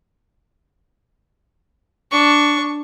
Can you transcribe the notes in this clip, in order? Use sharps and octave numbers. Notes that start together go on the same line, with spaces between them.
D4 C#6